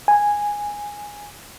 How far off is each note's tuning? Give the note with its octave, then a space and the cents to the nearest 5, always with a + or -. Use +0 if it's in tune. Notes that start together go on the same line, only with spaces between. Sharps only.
G#5 -10